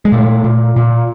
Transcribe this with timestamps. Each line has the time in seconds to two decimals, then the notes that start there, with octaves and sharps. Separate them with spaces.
0.05 G#3
0.12 A#2 A3
0.44 A#2
0.76 A#2